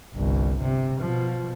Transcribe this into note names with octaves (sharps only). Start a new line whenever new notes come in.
G1 C2
C3
B2 F3